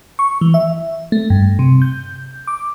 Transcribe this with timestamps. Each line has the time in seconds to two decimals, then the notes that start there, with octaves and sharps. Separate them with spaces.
0.19 C#6
0.41 E3
0.54 E5
1.12 A3
1.30 G2
1.59 C3
1.82 G6
2.47 D6